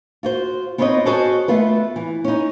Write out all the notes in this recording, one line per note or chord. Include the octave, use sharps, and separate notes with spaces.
F4 F#4 C5
B3 C4 D#4 F4 C#5 D#5
F#4 G#4 A4 C5 C#5 D#5
A3 B3 F4 B4
E3
C#4 D#4